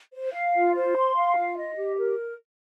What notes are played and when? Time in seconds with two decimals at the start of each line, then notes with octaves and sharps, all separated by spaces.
0.13 C5
0.34 F5
0.54 F4
0.75 C5
0.96 C6
1.16 F5
1.36 F4
1.57 D#5
1.78 G4
1.98 A#4